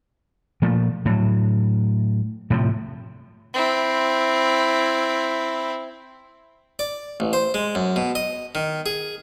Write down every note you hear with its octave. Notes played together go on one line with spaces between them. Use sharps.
A#2 F3 A3
A2 F#3
A2 C3 E3 F3
C4 E4
D5
A1
C5
G#3
F#2
B2
D#5
D#3
G#4